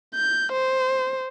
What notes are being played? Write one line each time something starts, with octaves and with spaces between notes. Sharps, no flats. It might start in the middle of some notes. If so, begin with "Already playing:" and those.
G6
C5